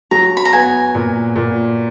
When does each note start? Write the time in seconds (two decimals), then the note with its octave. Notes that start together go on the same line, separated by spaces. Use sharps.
0.11 F#3 A#5
0.37 B5
0.45 A#5
0.53 B3 G#5
0.95 A#2
1.36 A#2